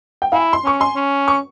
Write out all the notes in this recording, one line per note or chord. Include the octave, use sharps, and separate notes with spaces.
G5
E4 F5 G#5
C6
C#4 C#6
G#5 C6
C#4
C#6